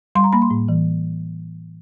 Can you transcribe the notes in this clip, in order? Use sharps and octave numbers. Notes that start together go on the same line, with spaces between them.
G3 C6
A#5
A#3 B5
C6
A2
E3